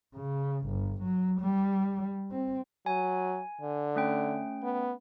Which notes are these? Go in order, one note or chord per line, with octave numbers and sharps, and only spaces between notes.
C#3
G1
F#3
G3
C4
F#3 G#5
D3
A3 C#4 G5
B3